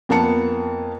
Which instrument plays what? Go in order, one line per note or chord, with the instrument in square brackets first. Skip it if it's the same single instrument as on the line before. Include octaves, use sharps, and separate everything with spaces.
[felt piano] F2 A#3 B3 A5 C#7